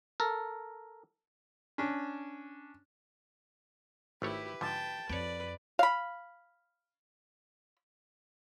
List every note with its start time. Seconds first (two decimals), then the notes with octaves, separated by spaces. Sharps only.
0.20 A4 A#4
1.78 C#4 D4
4.22 G#1 A3 E4 G4 B4 C#5
4.61 G#2 D3 F3 G5 A5
5.09 F2 B4 C#5 D5 G5
5.79 F5 B5